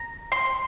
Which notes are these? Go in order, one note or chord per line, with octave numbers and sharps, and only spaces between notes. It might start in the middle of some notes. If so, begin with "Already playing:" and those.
Already playing: A#5
C6